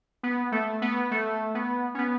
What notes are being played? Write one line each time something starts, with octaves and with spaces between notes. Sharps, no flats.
B3
A3
B3
A3
B3
C#4
B3